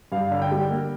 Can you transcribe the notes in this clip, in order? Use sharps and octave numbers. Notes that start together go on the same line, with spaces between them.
G2 F5
D3
G5
G3
A#3